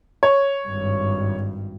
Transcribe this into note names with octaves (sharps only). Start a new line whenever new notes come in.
C#5
G#1 G2